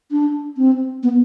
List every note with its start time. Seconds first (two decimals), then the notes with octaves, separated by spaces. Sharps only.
0.11 D4
0.57 C4
1.03 B3